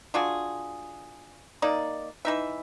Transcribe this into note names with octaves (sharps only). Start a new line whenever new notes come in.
D4 F4 F#4 G#4
A#3 D#4 D5
E3 D#4 E5